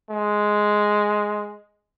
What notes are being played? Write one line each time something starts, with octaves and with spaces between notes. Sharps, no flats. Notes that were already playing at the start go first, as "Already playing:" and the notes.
G#3